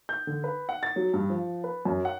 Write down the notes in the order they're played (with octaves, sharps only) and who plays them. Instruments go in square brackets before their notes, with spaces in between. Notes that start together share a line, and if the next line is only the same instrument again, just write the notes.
[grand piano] G6
D3
B4
F#5
A6
F#3
G2
F3
B4
F#2
F#5